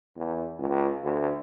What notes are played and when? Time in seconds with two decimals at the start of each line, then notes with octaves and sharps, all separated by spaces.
0.16 E2
0.59 C#2
1.03 D2